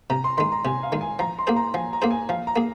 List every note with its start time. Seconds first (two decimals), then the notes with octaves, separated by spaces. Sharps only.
0.10 C3 A#5
0.24 C6
0.37 D#3 G#3 C6
0.52 A#5
0.65 C3 G#5
0.83 F5
0.92 D#3 G#3
1.01 G#5
1.19 F3 A#5
1.39 C6
1.47 A#3 G#4 C5
1.56 A#5
1.74 F3 G#5
1.93 A#5
2.02 A#3 G#4 C5
2.11 G#5
2.29 F3 F5
2.47 A#5
2.56 A#3 G#4